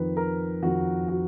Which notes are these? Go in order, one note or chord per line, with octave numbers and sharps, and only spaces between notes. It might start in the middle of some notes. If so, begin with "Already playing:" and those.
Already playing: F2 D#3 B4
A#4
F2 D#3 F#4
F#4